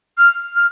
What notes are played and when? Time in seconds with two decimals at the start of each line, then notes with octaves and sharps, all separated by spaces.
0.18 F6
0.55 F6